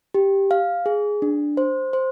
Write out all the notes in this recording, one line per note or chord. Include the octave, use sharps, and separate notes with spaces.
G4
F5
G#4
D4
C5
C5